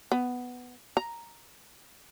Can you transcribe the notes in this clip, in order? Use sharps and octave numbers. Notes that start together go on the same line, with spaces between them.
B3
A#5